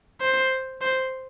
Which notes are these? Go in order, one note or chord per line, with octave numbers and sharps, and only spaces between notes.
C5
C5